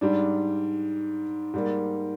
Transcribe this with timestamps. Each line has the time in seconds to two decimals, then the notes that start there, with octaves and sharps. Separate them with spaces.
0.01 G#2 G3 D4
1.54 G#2 G3 A#3